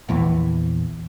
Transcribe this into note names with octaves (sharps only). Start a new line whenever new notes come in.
A#1 E2 E3